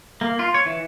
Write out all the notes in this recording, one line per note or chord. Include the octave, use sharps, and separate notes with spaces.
A#3
F4
C#5
E3